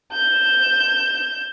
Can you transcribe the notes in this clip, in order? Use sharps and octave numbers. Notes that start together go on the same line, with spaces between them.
G6 E7